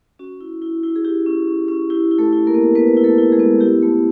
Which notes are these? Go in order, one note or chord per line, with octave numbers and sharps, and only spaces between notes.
C#4 F#4
E4
E4
E4
G#4
E4 G4
C#4
C#4
C#4
E4 G4
E4
A3 A4
E4
A#3 A#4
B3
B3 B4
E4
A3 A4
E4
G#3 G#4
B3
E4 G4
A3